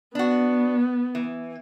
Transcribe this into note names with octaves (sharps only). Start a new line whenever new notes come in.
B3 D4 F#4
E3